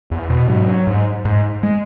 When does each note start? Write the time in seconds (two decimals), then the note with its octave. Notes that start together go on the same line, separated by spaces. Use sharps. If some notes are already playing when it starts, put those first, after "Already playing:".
0.11 E2
0.30 B2
0.48 G#2 F#3
0.87 G#2
1.25 G#2
1.63 G#3